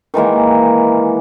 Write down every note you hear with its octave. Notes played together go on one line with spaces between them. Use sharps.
D#3 E3 G#3 A#3